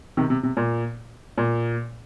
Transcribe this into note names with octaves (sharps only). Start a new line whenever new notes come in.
C3 D#3
C3
C3
A#2
A#2